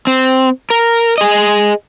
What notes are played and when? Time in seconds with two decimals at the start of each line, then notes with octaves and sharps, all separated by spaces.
0.07 C4
0.70 A#4
1.18 G#4 D#5